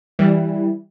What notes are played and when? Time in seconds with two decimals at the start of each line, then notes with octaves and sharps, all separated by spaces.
0.19 E3 G3